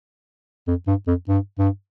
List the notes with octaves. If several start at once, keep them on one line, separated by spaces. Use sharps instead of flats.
F2
G2
F2
G2
G2